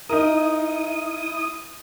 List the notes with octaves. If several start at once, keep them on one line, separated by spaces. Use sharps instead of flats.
D#4 E4 A#4 D#6